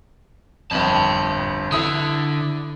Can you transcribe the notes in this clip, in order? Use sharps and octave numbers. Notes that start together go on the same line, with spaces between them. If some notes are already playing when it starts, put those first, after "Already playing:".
G1 F2 A5 B5
D3 E4 D#6